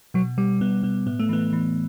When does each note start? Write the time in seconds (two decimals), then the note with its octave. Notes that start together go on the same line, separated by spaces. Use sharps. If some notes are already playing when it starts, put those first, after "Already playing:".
0.14 B2 F#3
0.38 B2 G3
0.61 B2 B3
0.83 B2 B3
1.06 A2 B3
1.19 A3
1.29 E3 B3
1.53 E3